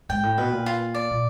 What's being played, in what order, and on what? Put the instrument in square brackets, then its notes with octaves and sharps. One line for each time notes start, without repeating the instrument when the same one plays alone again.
[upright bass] G#2 [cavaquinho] G5
[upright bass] A2
[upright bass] B2 [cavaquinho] B4
[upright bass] A#2
[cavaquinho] F4
D5
[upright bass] A#2